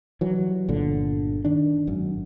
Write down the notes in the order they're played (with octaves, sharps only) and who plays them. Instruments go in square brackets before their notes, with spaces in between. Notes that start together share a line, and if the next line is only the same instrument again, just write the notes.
[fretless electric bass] E3 F#3 G3
G1 A#2 D3
D#3 D4
G#1 F#2